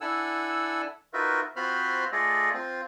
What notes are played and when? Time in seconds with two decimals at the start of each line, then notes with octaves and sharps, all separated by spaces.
0.01 D4 E4 A4 F#5 G#5 E6
1.13 D#4 F4 F#4 A#4 B4 E5
1.56 C4 F4 F#4 C5 B5 F6
2.12 A3 F4 G#4 A4 D5 D#5
2.53 C4 F4